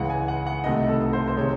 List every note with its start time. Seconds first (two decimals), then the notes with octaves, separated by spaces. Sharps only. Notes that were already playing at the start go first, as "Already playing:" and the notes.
Already playing: C#2 C#3 E3 G#3 F#5
0.10 G#5
0.28 F#5
0.47 F#5
0.64 C2 C3 D#3 A3 D#5
0.89 A4
1.00 A4
1.13 C5
1.28 C5
1.37 C3 D#3 G#3 C#5